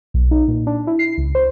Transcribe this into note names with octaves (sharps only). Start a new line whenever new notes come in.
B1
D#4
A#2
D4
E4
C7
C#2
C5